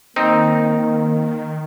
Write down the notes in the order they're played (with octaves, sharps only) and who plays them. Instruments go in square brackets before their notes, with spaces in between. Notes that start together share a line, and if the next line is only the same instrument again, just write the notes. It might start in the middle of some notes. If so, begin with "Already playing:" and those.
[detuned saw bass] D#3 [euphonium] A#3 [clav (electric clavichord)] C4 D#4